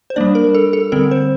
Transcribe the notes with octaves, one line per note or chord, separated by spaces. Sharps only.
C5
G3 A#3 D4 D5
A#4
A4
A4
D3 G3 C4 A#4
C5